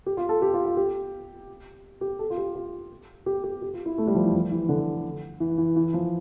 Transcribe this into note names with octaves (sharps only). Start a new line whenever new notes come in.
G4
F4
A4
G4
F4
F4
G4
G4
A4
F4
G4
F4
G4
G4
G4
F4
E4
A3
G3
F3
E3
F3
E3
D3
E3
E3
E3
F3